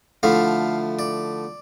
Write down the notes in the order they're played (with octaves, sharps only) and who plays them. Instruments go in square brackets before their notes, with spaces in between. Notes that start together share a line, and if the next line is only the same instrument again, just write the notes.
[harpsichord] D3 F3 A3 E4 F5
D5